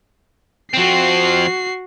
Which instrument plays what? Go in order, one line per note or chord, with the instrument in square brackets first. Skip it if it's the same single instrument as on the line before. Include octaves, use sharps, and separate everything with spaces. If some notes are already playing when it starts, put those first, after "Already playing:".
[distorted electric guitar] F3 C4 [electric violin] F#4 C7